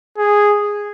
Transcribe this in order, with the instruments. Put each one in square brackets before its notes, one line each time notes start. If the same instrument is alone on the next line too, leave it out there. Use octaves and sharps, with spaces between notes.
[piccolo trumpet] G#4